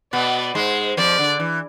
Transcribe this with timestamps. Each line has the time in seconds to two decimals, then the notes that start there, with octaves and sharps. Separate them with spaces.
0.13 B2 B3 D5
0.55 G#2 G#3 C5
0.97 F2 F3 D5
1.19 D3
1.40 E3